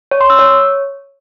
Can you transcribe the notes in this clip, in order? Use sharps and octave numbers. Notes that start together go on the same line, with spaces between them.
C#5
C6
E6
C#5